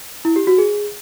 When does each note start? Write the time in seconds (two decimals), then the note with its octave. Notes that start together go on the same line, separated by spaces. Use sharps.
0.25 E4
0.36 G4
0.47 F#4
0.58 G#4